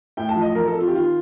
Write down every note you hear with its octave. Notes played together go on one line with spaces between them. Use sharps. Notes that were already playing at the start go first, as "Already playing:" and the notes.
A2 G5
A5
F3
D#5
F3 A#4
A4
C4
F4
G4
D#3 F4